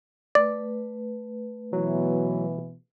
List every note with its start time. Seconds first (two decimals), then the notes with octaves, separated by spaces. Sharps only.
0.35 A3 B4 D5
1.73 B2 E3 F#3